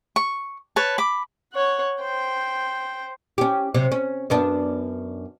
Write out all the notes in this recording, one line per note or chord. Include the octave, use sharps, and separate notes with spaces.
C#6
B4 C#5 A5
B5 D6
C#5 F#5
C5 G5
C#4 G4
C3 F#3
C#4
F#2 B3 D4